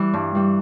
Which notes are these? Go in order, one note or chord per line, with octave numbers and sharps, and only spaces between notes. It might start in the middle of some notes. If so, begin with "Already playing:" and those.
Already playing: E3 G3
G2
E3 G3